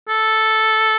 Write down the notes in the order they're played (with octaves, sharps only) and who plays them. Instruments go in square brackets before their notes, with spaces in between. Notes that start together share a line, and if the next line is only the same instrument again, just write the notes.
[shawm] A4